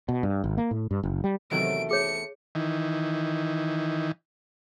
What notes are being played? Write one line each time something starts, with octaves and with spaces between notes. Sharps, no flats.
B2
G2
G#1
A#3
A2
G2
F#1
G3
E2 C3 D#3 F#3 A3 D7
G#4 C#5 C#7
D#3 E3